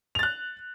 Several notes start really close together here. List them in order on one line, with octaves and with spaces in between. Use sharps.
F7 A6 F#6